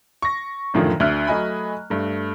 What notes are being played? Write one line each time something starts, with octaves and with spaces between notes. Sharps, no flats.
C#6 A#6
F1 F#2 A2 D3 D#3 F3
D2 D3 D4 E5 F6 F#6
F#3 A3 D#5 G#5 B5
G2 A3